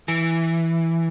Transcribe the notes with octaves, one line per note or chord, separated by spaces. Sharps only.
E3